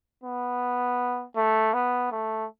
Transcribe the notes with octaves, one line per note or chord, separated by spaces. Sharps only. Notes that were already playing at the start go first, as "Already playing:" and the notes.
B3
A3
B3
A3